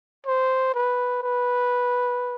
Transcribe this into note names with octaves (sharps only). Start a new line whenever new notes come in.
C5
B4
B4